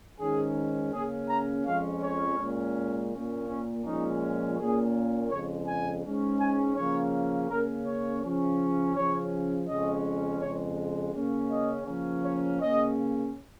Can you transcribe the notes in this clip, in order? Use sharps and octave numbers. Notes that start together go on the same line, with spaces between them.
G#2 D#3 C#4 G#4
C#3 A#3 C#4 G#4
A#5
F2 F3 G#3 C#4 F5
C#5
A#2 G#3 C#4
A#2 A#3 C#4
C#4
A#2 F3 G#3 C#4 D#4
A#2 A#3 C#4 G#4
F2 C#3 G#3 C#5
G#5
G#2 G#3 C#4
G#5
C#3 F3 A#3 C#4 C#5
C#3 A#3 C#4 A#4
C#5
C#3 F3 C#4
C#3 F3 C#4 C#5
F2 C#3 G#3 C#4 D#5
F2 C#3 G#3 C#5
C#3 A#3 C#4
D#5
C#3 F3 A#3 C#4
C#5
C#3 A#3 C#4 D#5